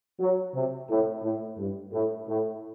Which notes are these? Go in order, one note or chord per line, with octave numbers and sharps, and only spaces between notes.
F#3
C3
A2
A2
G2
A2
A2